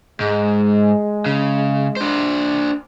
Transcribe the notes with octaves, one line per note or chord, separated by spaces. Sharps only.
G#2 G#3
C#3
D4 C5